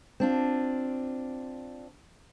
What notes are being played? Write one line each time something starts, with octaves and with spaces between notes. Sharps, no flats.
C4 D4 F4